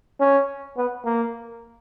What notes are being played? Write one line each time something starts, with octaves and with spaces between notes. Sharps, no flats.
C#4
B3
A#3